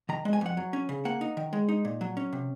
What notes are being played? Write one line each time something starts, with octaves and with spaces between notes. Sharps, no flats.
D#3 A#5
G#3
G#5
F2 F#5
F#3
C#4
C#3
A#3 F#5
D#4
D#3
G#3
D#4
A#2
F#3
C#4
C3